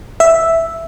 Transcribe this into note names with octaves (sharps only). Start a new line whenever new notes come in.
E5